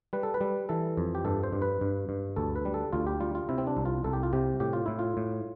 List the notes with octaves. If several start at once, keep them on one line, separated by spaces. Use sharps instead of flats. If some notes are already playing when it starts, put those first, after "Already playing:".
G3 B4
A4
B4
G3
E3 A4
F2
G4
G2 A4
C5
G2
B4
G2
G2
D2 A4
B4
G3
A4
D2 F4
G4
G3 F4
F4
C3 E4
C4
D4
C2
F4
C2 A4
G4
F4
C3 G4
A2 G4
F4
A2 E4
F4
A2